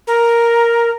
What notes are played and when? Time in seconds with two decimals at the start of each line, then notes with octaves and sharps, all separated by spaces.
0.07 A#4